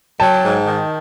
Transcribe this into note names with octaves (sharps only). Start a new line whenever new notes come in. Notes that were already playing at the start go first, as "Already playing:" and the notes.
F#3 G5 A5
G#2
D#3